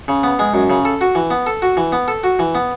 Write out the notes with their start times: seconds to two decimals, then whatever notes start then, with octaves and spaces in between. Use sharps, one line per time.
0.08 C#3
0.23 B3
0.39 G#3
0.54 F#2
0.70 C#3
0.85 A4
1.01 F#4
1.15 E3
1.31 B3
1.47 A4
1.62 F#4
1.77 E3
1.92 B3
2.08 A4
2.24 F#4
2.39 E3
2.55 B3